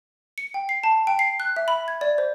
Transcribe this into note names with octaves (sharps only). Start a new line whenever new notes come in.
C#7
G5
C7
A5
G5
C7
F#6
E5
B5
G#6
D5
C5